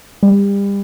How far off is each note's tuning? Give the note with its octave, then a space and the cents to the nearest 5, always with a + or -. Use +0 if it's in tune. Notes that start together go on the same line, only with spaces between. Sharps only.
G3 +30